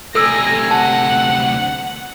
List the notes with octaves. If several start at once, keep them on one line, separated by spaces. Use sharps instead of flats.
D2 C3 A4 G#5 E6 A#6
F#5 A5